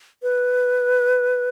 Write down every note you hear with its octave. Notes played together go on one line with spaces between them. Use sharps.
B4